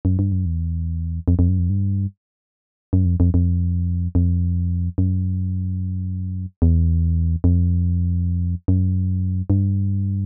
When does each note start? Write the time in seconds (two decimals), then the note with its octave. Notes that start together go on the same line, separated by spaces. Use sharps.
0.05 F#2
0.19 G2
0.32 F#2
0.46 E2
1.28 F2
1.39 F2
1.49 F#2
1.59 F2
1.70 G2
2.93 F#2
3.06 F2
3.20 F2
3.34 F2
4.15 F2
4.98 F#2
6.62 E2
7.44 F2
8.68 F#2
9.50 G2